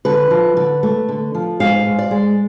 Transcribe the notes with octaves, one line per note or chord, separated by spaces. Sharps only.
D3 B4
F3
D3
A3
D3
F3
G#2 F5
G#2
D5
G#3